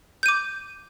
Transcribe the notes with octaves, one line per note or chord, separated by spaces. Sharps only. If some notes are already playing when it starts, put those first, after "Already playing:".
D6 G6 D#7